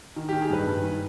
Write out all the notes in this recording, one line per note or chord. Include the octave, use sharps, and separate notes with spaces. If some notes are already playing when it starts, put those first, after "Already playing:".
D#3
G4
D#3
G#4
G2 B4
G2
D#3